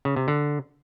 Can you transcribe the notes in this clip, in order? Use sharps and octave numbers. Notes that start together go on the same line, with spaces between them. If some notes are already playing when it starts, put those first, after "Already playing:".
C#3
C3
D3